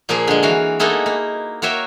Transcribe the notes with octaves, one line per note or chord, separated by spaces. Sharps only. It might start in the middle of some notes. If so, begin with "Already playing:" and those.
A#2 F3 A#3 F4 G#4
D3 G#3
E3 F#4 F5
G#3 A#3 B3 D#4 E4 A4
A#3
A#3 F#4 C#5 E5 G5